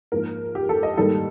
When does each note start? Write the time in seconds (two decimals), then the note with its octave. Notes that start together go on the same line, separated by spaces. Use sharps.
0.12 G#2 F3 A#3 A#4
0.55 G4
0.69 A4
0.83 D#5
0.97 G#2 D#3 G3 A#3 A4